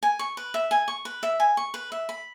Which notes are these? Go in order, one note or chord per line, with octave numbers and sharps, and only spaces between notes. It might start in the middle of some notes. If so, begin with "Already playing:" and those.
G#5
C#6
B4
E5
G#5
C#6
B4
E5
G#5
C#6
B4
E5
B5